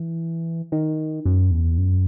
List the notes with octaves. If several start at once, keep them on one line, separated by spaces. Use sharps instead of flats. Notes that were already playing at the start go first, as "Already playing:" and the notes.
Already playing: E3
D#3
F#2
E2
F#2